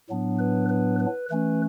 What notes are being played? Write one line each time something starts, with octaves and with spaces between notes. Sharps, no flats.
A2 F#3 B3 D4
B4
B4
B4
E3 A3 C#4 B4